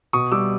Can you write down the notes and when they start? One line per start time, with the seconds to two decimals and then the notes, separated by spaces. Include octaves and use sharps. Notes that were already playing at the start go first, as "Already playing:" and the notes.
0.13 B2 C#6 D#6
0.32 G3 D6 E6